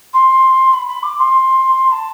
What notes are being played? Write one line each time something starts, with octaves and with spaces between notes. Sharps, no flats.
C6
B5
B5
D6
C6
A5